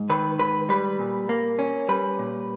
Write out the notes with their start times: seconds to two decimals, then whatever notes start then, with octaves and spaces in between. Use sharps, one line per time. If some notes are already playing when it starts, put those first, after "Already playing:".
Already playing: G#2
0.10 D#3 B4
0.39 G#2 B4
0.69 G3 B4
0.99 A#2
1.29 A#3
1.59 C#4
1.88 G3 B4
2.19 A#2